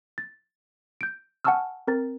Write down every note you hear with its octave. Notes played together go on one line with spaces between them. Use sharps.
A6
G6 D7
F#5 G#5 A5 C#6 E6 F6
C4 A#4 A#5 A6